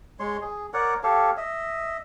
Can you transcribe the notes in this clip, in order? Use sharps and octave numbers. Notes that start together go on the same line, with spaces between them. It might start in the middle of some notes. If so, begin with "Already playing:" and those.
G#3 C#5 C6
G#4
A#4 C#5 D5 F#5
G4 A4 C#5 F5
D#5 E5